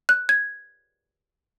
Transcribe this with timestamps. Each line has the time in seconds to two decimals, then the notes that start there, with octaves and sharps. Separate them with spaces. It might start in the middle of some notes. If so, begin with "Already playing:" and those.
0.09 F#6
0.29 G#6